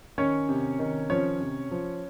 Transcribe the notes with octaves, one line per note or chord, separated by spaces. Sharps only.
D#3 C#4 C#5
C3
D#3
F3 C#4 C#5
C3
F3